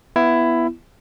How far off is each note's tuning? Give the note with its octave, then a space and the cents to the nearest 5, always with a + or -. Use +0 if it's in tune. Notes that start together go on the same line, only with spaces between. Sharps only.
B3 +0 E4 +15